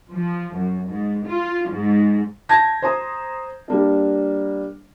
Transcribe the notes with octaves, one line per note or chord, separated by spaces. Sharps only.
F3
F#2
G#2
F4
G#2
A5 G6 G#6 A#6
C5 A#5 D#6
G3 A#3 D4